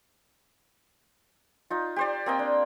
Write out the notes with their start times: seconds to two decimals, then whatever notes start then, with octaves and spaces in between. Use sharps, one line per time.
1.70 D#4 F4
1.96 G4 C5 D5
2.26 A#3 C4 D#5 G5
2.39 D4